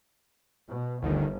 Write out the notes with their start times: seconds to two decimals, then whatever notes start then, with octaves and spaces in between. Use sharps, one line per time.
0.67 B2
1.02 G1 D2 D3 D#3